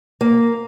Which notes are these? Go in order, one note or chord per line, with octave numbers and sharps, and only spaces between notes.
A#3